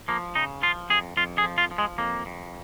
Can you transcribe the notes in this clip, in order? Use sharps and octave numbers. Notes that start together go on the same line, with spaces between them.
F3 A#3
C#3 D#4
F3 F4
F2 G#4
F2 F4
G#4
F3
F4
F3
G#3
F2 A#3
F2